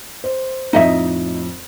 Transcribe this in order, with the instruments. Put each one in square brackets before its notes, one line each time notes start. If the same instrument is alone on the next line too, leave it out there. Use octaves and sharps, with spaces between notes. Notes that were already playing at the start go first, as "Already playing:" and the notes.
[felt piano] C5
[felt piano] F2 A2 [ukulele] D#4 D#5 E5